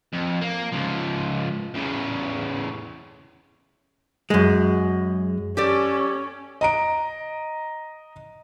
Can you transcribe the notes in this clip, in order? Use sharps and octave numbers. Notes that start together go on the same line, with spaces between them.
F2
A#3
C#2 F3
E2 C#3
F#2 G#3
C#4 G4 A4 D5
D#5 A#5 D7